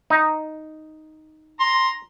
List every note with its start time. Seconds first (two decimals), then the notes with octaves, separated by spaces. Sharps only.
0.10 D#4
1.60 A#5 C6